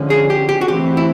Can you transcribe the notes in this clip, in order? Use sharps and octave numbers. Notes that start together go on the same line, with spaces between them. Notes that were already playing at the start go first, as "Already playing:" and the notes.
Already playing: D3 F3 G#3 C#4
G#4
G4
G4
F#4
E3 A3 C4 G4
E4